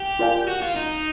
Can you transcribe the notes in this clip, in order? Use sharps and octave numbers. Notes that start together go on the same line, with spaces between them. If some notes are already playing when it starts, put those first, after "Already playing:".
Already playing: G4
F4 A#4 D5 F5 G#5
F#4
F4
D#4